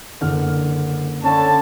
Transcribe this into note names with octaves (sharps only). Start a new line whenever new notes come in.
F#1 D3 F6
D3 C#4 A5